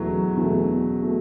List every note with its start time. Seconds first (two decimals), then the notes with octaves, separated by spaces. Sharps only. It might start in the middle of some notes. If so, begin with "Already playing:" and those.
Already playing: E2 B2 F#3 A3
0.37 E2 B2 A3
1.02 B2 A3